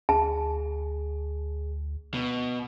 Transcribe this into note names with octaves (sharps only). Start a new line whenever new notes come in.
D2 G#4 A5
B2